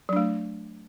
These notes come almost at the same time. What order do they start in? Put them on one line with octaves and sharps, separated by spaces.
F#3 D4 A3